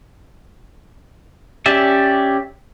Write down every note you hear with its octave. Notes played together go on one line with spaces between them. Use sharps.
C#4 G4 D5 E5